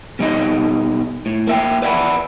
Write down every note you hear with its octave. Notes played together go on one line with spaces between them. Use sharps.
B2 G3 D#4 D#5
A2
A#3 E5 G5
B4 D5 E5 F#5 B5